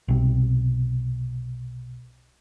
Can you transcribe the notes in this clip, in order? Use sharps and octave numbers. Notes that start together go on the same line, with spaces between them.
B1 C3